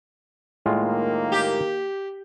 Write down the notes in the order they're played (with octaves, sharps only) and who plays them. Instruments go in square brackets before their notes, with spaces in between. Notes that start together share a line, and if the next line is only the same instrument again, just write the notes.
[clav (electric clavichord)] A2 G#3 F4 [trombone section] D#3 A#3
[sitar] G4